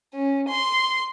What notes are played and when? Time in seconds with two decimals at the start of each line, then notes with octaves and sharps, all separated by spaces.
0.14 C#4
0.49 C6